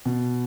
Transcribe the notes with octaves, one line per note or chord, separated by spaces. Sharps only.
B2